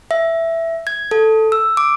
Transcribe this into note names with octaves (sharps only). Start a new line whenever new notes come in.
E5
G#6
A4
E6
D6